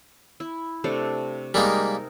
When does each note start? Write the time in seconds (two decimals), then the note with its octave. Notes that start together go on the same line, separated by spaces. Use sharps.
0.40 E4
0.84 C3 A3 D4
1.54 G3 G#3 A#3 D#4 A#4